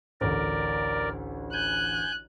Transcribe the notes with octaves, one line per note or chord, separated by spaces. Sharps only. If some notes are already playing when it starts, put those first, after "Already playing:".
A1 D2 A#4 D5
G#5 F#6 G6